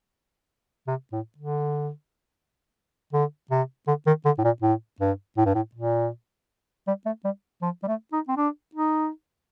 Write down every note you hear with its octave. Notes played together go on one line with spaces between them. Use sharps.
C3
A2
D3
D3
C3
D3
D#3
D3
A2
A#2
A2
G2
A2
G2
A2
A#2
G3
A3
G3
F3
G3
A3
D#4
C4
D4
D#4